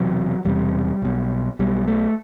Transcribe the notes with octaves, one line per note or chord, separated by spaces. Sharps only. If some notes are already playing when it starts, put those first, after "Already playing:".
Already playing: E1 E2 C3 F#3
E1 E2 C3 G3
B1 B2
B1 B2 G3
A3